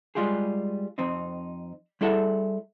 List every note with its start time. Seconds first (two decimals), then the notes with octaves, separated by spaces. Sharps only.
0.15 G3 G#3 F4 G4 G#4
0.98 F2 C4 D#4
2.01 G3 E4 G#4 A4 E5 F#5